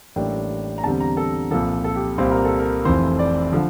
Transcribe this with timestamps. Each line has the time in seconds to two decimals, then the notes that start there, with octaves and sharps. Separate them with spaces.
0.16 A1 A2 G3 A#3 D4 G5
0.78 A#5
0.84 E2 D3 G3 C4 A5
1.00 A#5
1.17 A4
1.51 C2 A#2 F3 A4
1.84 A4
1.96 G4
2.18 C2 A#2 G3 C4 C5
2.31 A#4
2.45 A4
2.59 A#4
2.85 F1 F2 E3 C5
3.19 D5
3.52 D3 F3